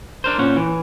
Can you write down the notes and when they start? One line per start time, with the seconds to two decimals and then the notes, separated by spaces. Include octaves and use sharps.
0.24 D4 A#4 C5
0.38 A#2 C#4 F#5
0.56 E3